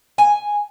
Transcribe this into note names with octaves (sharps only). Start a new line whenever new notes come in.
G#5